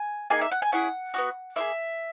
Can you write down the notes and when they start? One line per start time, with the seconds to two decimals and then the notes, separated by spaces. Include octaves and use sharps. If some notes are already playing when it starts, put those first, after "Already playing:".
Already playing: G#5
0.30 A#3 D#4 G#4 G#5
0.41 E5
0.51 F#5
0.62 G#5
0.72 C#4 E4 G#4 F#5
1.14 B3 D#4 F#4
1.56 A#3 E4 G#4 E5